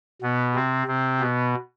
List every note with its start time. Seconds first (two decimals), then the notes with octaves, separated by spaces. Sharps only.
0.22 B2 B3
0.55 C3 C4
0.87 C3 C4
1.20 B2 B3